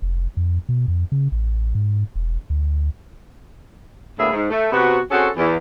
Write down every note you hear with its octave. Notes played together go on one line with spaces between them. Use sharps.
F1
F2
B2
F2
C#3
A1
G#2
E1
D2
D2 A2 A#3 B3 G#4 E5
G#2
A3
C3 B3 F#4
C4 C#4 F#4 G#4 A4
E2